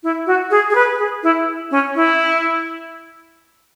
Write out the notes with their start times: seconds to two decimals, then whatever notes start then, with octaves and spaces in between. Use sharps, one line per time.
0.03 E4
0.26 F#4
0.50 G#4
0.70 G#4
0.75 B4
0.98 G#4
1.23 E4
1.71 C#4
1.95 E4